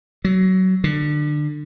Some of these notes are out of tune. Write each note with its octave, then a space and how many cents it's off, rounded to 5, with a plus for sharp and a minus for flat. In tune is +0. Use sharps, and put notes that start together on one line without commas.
F#3 +20
D3 +25